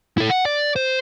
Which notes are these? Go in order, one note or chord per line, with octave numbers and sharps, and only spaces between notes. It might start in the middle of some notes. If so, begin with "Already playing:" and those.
E4 A4
F#5
D5
C5